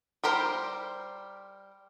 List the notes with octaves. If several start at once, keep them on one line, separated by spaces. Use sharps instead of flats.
G3 G4 A#4 C5